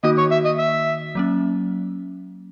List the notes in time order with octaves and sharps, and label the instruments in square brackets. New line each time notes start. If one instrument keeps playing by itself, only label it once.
[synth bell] D#3 A#3 D#4 F#4 [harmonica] D#5
[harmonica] C#5
E5
D#5
E5
[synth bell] F#3 A#3 C#4